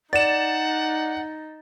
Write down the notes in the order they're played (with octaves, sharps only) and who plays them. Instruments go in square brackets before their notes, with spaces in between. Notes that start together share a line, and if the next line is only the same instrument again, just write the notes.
[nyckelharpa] D#4 [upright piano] D5 [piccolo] F#5 [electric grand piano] A6 E7